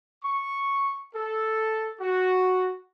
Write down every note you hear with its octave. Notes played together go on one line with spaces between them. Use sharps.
C#6
A4
F#4